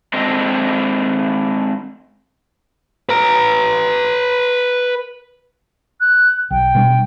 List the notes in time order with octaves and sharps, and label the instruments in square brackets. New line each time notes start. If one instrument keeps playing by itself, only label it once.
[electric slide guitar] G#3 C4 D4 A4 D#5
[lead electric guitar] B4 A#5
[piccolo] F#6
[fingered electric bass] B1 [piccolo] G5
[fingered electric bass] B2 G3 D4